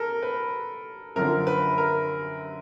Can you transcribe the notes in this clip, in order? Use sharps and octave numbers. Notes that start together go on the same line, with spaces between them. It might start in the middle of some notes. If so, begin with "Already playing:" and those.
Already playing: A4 A#4
B4
F#2 D3 F3 A#4
B4
A#4